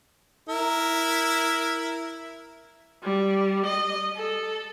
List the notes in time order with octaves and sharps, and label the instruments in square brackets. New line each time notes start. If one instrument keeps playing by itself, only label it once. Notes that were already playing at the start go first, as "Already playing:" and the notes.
[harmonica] E4 A#4
[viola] G3
D#5
A4